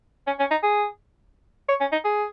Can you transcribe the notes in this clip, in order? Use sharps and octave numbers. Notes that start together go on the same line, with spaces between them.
C#4
C#4
D#4
G#4
C#5
C#4
D#4
G#4